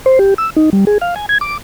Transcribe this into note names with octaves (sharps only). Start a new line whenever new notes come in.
C5
G4
E6
D#4
G3
G#4
F5
G#5
G#6
D6